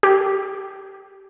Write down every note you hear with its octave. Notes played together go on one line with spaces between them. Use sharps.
G4